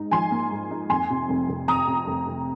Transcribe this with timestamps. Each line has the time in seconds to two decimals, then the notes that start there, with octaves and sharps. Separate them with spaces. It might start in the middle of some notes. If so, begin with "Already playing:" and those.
Already playing: G#2 D#4
0.11 F3 G#5 C6
0.31 A#3
0.51 G#2
0.71 D#4
0.90 F2 G#5 C6
1.10 C3
1.29 F1
1.48 F1
1.68 F2 A#5 D#6
1.87 C3
2.07 F1
2.28 F1